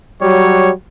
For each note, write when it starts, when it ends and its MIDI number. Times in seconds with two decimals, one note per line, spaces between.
0.21 0.69 54
0.21 0.69 55
0.21 0.69 73